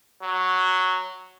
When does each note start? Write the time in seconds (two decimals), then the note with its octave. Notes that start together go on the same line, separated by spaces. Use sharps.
0.23 F#3